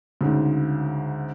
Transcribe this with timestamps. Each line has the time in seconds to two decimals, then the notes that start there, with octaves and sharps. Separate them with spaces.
0.21 D2 G#2 C#3